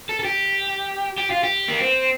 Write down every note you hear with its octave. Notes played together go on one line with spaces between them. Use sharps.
A4
A4
G4
G4
F4
G4
A#3
C4